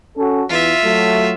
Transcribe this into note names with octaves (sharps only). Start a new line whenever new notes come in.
C#4 F#4 A4
E2 E3 F4 E5
F#3 A3